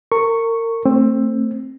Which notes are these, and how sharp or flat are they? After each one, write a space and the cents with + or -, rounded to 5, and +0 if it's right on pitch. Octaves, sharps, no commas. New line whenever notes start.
A#4 -30 C#6 +0
A3 +30 C4 +20